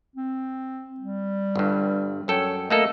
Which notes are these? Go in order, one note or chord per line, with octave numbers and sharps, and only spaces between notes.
C4
G3
G1 G2
F#2 A4 C#5 G5
A3 A#3 A4 D#5